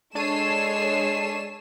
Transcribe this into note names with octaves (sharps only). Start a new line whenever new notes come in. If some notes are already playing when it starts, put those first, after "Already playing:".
G#3 D4 A4 C#5 A5 C7 D#7 E7